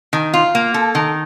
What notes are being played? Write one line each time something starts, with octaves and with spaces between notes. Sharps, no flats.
D#3
F4
A#3
A4
D#3